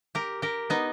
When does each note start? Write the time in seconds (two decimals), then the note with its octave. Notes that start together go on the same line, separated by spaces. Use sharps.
0.15 G4 A#4
0.42 G4 A#4
0.70 B3 D#4